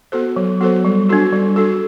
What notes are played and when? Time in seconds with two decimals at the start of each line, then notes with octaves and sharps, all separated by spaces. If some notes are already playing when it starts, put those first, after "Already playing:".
0.12 B3 F#4 A4 C5
0.36 F#3
0.61 B3 F#4 A4 C5
0.85 G3
1.09 D4 F#4 A4
1.33 G3
1.56 D4 F#4 A4